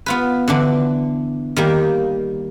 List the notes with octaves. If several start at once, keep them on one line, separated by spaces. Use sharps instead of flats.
B3 F4 B4
D3 E3 D4
D#3 G3 A#3